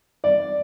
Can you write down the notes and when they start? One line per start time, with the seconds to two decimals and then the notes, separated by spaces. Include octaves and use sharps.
0.24 D5